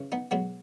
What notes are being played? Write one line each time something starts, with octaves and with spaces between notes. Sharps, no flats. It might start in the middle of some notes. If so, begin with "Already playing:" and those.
Already playing: C#3 E3
B3 D#4
B2 F#3 G#3 B3